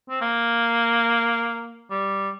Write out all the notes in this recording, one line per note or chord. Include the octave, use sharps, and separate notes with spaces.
C4
A#3
G3